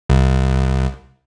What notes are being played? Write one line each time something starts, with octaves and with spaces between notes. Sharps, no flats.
C2